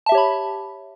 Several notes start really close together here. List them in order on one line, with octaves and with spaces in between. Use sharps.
A5 E5 G4 C#5 B5